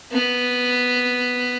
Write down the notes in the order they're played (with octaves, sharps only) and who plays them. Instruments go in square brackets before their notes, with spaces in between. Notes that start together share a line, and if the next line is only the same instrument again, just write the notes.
[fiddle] B3